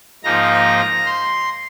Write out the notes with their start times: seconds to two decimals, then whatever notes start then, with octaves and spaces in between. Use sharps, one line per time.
0.23 G#2 F3 A#3 D#4 A#5
1.06 C6